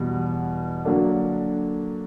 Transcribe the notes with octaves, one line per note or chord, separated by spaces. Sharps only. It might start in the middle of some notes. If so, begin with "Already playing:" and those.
Already playing: E2 B2 G3
D3 F#3 A#3 D4